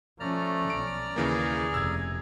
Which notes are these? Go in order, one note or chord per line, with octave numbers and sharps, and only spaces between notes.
F3 A3 C#4 D5 A#5 F6
B1 C#4 D7
D#2 C#3 E3 A#3 G#4
F1 E6 G#6